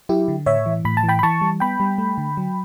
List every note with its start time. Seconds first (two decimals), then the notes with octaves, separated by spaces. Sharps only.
0.09 F#3 E4 G4
0.28 D3
0.46 A2 C#5 E5
0.66 E3
0.85 A2 B5
0.97 A5
1.03 E3
1.08 G5 B5
1.19 B5
1.23 E3 A5 C#6
1.41 G3
1.60 B3 G5 B5
1.80 G3
1.98 A3
2.18 D3
2.37 F#3